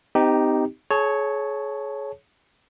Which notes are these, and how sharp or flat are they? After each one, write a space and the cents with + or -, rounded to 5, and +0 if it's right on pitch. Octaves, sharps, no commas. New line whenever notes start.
C4 -35 D#4 +0 G4 +0
G#4 +35 C#5 +0 A5 +0